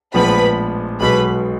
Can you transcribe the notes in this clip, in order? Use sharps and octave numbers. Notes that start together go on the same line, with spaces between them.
A#1 A2 F3 G#3 B3 B4 B5
B1 B2 G#3 B4 B5